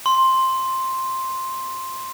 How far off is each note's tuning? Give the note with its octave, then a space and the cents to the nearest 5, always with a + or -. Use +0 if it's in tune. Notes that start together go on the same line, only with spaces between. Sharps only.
C6 +5